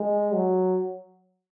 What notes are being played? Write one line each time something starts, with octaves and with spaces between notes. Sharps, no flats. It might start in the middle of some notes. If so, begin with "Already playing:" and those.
Already playing: G#3
F#3